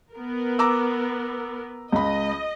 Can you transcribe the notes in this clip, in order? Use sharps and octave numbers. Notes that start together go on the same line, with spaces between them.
B3 A#4
A#5 D6 E6
C#2 D#5 B5